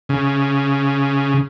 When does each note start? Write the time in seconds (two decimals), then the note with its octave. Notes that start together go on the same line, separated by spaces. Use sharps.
0.09 C#3